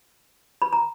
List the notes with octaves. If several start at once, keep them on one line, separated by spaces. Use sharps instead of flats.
B5
A#5